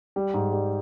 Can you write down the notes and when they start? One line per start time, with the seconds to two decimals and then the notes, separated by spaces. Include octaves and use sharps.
0.16 G3
0.34 G#2
0.53 G3